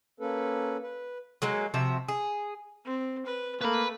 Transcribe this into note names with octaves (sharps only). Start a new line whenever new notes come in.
A#3 C#4 A4 B4
B4
F#3 G#3 A#3
C3 F3 F#4 E5
G#4
C4
B4
A3 A#3 B4 B5